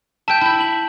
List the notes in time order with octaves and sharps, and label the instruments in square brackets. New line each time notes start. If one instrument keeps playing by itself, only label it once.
[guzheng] E5 G5 [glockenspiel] A5 G6
[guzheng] E4 B5
[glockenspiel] F#7